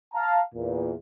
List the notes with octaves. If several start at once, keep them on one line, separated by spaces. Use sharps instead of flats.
F5 A5 A#5
E2 A#2